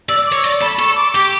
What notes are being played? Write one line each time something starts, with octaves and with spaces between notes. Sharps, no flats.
D5 E6
D6
C#5
D5 C#6
A4 B5
A4 C#6
D6
G4 D6